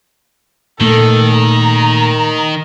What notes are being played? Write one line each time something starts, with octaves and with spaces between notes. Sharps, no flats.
A#2 D#3 A3 A4
A#5